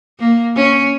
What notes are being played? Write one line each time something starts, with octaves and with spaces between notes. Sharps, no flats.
A#3
C#4